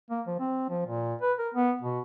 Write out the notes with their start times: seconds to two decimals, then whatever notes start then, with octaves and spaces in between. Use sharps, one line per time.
0.10 A#3
0.27 F3
0.40 C4
0.69 F3
0.86 A#2
1.22 B4
1.39 A#4
1.54 B3
1.82 B2